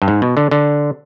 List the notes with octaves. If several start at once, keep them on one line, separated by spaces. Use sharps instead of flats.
G2
G#2
B2
D3
D3